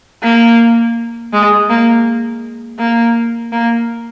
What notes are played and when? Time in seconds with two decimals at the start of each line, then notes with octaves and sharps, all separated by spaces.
0.23 A#3
1.33 G#3
1.70 A#3
2.79 A#3
3.52 A#3